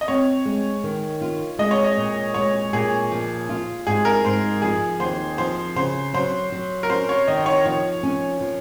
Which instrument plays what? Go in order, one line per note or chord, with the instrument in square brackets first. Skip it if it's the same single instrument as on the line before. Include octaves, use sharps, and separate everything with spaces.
[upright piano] D#5
[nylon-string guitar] C4 [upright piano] C#5
[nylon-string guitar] G#3
D#3
F4
[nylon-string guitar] G#3 [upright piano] D#5
[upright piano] C#5
D#5
[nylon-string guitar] A#2
[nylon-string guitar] G#3 [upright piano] C#5
[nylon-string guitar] A#2 [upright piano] G#4
[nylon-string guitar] F3
F4
[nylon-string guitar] G#2 [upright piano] G#4
[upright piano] A#4
[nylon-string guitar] G#2 [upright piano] C5
[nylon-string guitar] F3 [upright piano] G#4
[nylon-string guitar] D#2 [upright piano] C5
[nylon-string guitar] F3 [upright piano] C5
[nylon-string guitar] C#3 [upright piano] C5
[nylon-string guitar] F#3 [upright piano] C5
[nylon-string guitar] F#3
[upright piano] A#4
[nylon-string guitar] C#4 [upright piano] C5
[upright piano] C#5
[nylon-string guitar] D#3 [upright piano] D#5
[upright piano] C#5
[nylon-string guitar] F3 [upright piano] C#5
[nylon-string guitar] C#4
F3